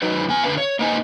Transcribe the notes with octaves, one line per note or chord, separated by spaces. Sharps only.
F#3 D#4 B4 C5
B3 G#5
D3 B4 F5
C#5
A#3 B3 D#4 C5 G#5